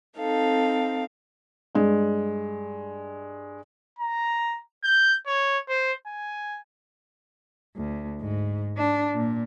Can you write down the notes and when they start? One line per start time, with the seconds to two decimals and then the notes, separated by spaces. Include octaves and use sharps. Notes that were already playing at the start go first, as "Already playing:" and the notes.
0.19 C4 D#4 A4 F5
1.75 G2 G#3
3.99 A#5
4.84 G6
5.27 C#5
5.69 C5
6.07 G#5
7.76 D2
8.21 G#2
8.78 D4
9.15 A#2